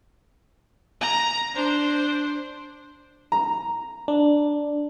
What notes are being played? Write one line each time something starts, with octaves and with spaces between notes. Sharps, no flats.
A#5
D4 C5
A#5
D4